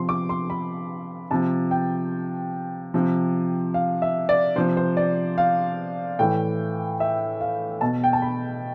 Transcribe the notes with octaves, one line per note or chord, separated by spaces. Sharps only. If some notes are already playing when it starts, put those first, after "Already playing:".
Already playing: C3 F3 C6
D6
C6
B5
C3 F3 A5
G5
C3 F3
F5
E5
D5
C3 F3 C5
C5
D5
F5
A2 E3 G5
E5
F5
B2 A5
G5
A5
B5